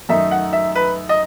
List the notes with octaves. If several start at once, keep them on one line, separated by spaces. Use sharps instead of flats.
F#2 D#3 A3 D#4 E5
F#5
E5
B4
D#5